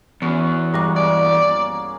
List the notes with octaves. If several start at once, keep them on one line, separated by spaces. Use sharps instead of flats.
E2 B3 C#4 F#4
G2 G3 G#3 A#3 D6
A#3 G#4 D5